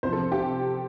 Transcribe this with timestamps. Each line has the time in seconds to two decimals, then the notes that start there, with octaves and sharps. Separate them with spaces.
0.03 C2 C3 F3 C5
0.13 A4
0.32 G4